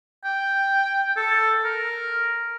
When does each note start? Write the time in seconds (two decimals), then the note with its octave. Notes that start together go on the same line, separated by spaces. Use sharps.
0.24 G5
1.16 A4
1.65 A#4